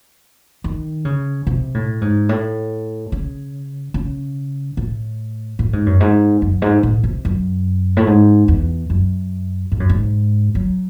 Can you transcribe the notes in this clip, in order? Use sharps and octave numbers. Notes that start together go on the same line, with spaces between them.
D#3
C#3
C3
A2
G#2
A2
C#3
C#3
A2
A2
G#2
F#2
G#2
F#2
G#2
A2
C3
F#2
A2
G#2
E2
F#2
G#2
F#2
G#2
F#3